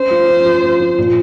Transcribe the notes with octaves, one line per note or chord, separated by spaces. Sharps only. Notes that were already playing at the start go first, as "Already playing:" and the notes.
Already playing: C#4 C5
F3
C#4
F3
F3
F3
A#2